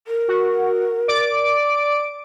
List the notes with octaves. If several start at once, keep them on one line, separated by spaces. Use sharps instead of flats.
A#4
F#4
D5 D6 D7